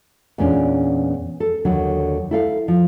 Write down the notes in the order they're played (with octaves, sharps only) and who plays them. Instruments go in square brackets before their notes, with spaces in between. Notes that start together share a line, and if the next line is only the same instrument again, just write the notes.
[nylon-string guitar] E2 A#2 C#4 D4
A4
D#2 D3 F#3
E4 A4 F5
F3